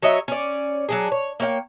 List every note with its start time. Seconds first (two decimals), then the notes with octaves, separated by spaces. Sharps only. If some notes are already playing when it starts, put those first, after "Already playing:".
0.02 F#3 C#5 D#5 E5
0.28 C#4 D5
0.89 F#3 D4 G#4
1.12 C#5
1.40 A#3 C#5 F5 G5